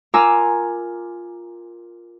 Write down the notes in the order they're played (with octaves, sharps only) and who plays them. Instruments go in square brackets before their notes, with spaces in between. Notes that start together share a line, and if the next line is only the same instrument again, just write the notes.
[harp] F4 A#4 G#5 A#5 D6 E6